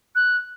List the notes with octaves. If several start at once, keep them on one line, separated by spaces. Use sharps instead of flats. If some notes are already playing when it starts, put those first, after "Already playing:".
F#6